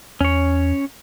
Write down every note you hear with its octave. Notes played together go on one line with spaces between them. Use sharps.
E2 C#4 C#5